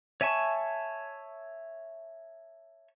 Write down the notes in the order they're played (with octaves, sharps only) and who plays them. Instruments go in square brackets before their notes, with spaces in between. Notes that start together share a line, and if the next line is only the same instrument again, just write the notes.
[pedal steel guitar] C#5 E5 G#5 A5 C#6